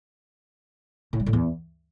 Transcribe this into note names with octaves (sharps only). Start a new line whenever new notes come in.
A2
G3
A2
E2